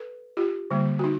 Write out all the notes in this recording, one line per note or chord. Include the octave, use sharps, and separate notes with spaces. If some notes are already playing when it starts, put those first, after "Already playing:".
Already playing: A4 B4
F4 G4
D3 G3 A#3
F#4
D#4